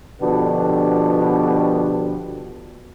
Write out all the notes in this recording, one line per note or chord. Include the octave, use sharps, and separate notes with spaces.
B2 D3 F3 B3 D4 G4